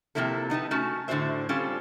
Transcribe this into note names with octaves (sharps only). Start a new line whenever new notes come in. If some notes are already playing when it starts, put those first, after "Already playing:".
C3 D#3 F3 A#3 E4 A4
B3 D#4 G4 A5
A3 C#4 F#4 A5
A2 D3 A#3 F#4 C5 E5
G3 C4 C#4 F4 A4